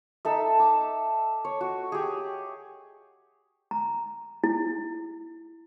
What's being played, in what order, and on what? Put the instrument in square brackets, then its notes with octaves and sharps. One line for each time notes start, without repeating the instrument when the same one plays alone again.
[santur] D#4 A4 E5
D6
C#5
F#4
G4 G#4
[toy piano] A#5
E4